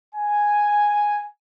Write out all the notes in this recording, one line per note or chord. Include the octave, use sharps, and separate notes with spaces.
G#5